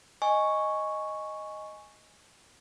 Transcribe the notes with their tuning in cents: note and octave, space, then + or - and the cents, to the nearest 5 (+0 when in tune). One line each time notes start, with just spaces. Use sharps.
D#5 +0 G#5 +0 C#6 +0